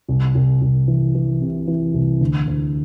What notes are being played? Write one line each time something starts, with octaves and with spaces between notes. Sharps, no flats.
C2
C2
C2
E3
E3
C3
E3
C2
D2
D2